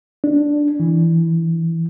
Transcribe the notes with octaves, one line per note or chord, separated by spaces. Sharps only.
D4
E3